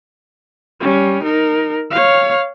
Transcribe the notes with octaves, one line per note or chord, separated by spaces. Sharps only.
G3 C#4
D#4 A#4
C#5 F5